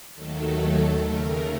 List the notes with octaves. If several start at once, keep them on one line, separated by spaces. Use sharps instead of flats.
D#2 D#3 F#3 A3 A4
D#2 C#3 A3 A#4